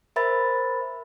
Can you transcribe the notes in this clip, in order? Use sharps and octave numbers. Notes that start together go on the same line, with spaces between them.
A#4 C5 E5 B5 A6